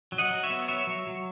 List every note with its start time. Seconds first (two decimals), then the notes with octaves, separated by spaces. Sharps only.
0.12 F#3
0.18 D#5 F#5
0.31 F#3
0.43 C#5 E5
0.50 B3
0.68 F#3 C#5 E5
0.87 F#3
1.07 F#3